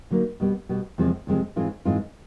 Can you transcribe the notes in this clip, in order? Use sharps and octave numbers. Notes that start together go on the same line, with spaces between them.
D3 F#3 A#3 D#4
B2 G3 B3
B2 G3 B3
E2 C3 F3 G#3 C4
E2 C3 F3 G#3 C4
G#2 E3 G#3 C4 F4
G#2 E3 G#3 C4 F4